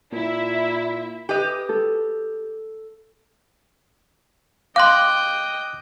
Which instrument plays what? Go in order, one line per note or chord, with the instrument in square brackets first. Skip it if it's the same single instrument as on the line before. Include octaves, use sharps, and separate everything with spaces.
[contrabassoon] A#2 [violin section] E4 E5
[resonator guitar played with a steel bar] G4 B4 D#5
[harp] A4
[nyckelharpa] D#5 G5 [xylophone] F5 C6 [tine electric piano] D6 F#6